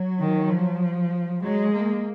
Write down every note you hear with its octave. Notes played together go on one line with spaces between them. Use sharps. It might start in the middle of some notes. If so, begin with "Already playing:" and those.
Already playing: F#3
D#3
F3
F#3 G#3
A#3